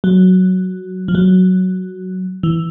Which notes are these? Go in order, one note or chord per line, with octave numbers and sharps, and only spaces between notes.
F#3
F3
F#3
E3